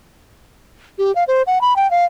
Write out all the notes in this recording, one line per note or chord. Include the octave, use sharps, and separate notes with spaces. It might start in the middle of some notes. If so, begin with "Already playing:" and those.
G4
F5
C5
F#5
B5
G5
F5